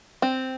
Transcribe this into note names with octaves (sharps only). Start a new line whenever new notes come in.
C4